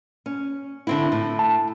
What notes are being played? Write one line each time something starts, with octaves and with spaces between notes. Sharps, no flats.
C#4
D3 C4 E4
A2
A5